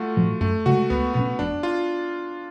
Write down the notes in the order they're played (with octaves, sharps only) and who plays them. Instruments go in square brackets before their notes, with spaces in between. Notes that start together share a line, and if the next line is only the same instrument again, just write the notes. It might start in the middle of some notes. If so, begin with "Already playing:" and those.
Already playing: [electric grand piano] A3 F4 F#4
[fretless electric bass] A2 F3
[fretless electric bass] F#2 [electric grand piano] A3
[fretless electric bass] C#3 G#3 [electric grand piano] F#4
[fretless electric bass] C#2 [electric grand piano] B3
[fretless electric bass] B2 G#3 C#4 [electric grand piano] B3
[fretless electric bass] F1 [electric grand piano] D4
[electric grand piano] F4